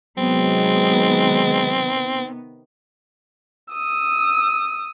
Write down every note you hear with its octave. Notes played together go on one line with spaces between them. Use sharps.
C3 D#3 F#3 G#3 B3 C4
D#6 E6